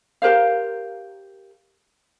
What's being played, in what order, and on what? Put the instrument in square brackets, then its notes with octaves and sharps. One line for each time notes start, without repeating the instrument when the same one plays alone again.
[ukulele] G4 A#4 C5 F5